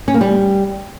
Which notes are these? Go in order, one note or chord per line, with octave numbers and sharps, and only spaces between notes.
C#4
A#3
G3